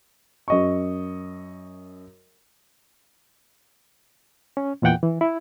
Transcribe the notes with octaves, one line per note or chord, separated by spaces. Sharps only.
F#2 D#5 C#6
C#4
E2 A#2 E3 F#5 G5
E3
E4